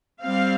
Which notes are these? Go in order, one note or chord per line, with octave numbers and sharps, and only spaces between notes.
G3 C4 F5